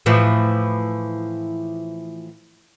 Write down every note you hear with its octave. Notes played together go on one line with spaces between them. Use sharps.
A2 E3 F3